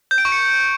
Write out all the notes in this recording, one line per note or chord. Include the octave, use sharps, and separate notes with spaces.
G6
D7
C#6
C#7